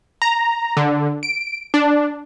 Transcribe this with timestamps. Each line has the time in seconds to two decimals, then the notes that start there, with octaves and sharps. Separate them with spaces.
0.22 A#5
0.77 D3
1.23 D7
1.74 D4